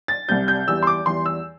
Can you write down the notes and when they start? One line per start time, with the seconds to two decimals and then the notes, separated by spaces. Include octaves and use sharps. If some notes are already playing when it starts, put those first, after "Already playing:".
0.08 A6
0.28 C2 C3 G3 G6
0.48 G6
0.67 E2 E3 G3 E6
0.83 C6
0.87 D6
1.06 E2 E3 G3 C6
1.26 E6